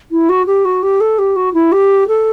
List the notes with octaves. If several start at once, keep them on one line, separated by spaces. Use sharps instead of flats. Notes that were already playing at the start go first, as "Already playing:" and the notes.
E4
F#4
G4
F#4
G4
A4
G4
F#4
E4
G4
A4